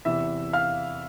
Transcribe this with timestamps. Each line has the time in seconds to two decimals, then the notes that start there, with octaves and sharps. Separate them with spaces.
0.05 E2 C3 E3 E5 E6
0.53 F5 F6